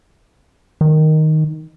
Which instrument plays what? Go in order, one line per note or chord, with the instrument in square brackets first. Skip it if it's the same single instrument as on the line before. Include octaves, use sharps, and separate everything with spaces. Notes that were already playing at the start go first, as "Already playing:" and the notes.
[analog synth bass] D#3